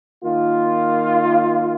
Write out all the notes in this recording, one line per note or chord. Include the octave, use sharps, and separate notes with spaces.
D#3 A#3 F4